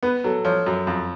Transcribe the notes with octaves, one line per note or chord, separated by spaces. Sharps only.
B3 B4
F#3 A4
F3 C#5
F#2
F2